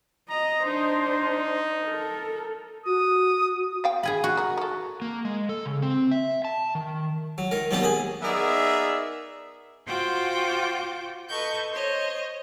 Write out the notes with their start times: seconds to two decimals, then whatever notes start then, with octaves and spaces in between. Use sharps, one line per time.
0.29 D#5 A#5
0.66 D4 D#4 C5
1.81 A4 A#4
2.86 F#4 D#6
3.84 B3 F5 G5
4.03 G#4 G#5 B5
4.24 F#4
4.37 D#4 A#4
4.58 A4 A#4
5.02 A#3
5.25 G#3
5.49 A4
5.66 C#3
5.82 C4
6.11 E5
6.45 A5
6.75 D#3
7.38 F#3
7.51 D#3 A#4
7.71 D#2 B2 F#3 B3 D4 G4
7.83 G#4 B5 D#6
8.23 B3 D#4 G#4 A#4 D5 E5
9.87 F4 F#4 C5 G5 D6
11.29 A4 B4 D#5 C#6 G6
11.71 C5 C#5 D#5